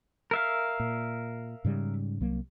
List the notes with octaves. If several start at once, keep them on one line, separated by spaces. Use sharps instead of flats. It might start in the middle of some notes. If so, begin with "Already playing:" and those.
A#4 E5 F5
A#2
G#2 C#3 G3
C2 F#3 A#3